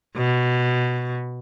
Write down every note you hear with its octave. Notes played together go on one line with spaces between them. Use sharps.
B2